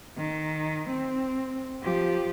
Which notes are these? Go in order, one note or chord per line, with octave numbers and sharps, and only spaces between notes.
D#3
C4
F3 G4